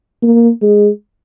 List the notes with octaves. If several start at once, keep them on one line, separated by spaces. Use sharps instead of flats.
A#3
G#3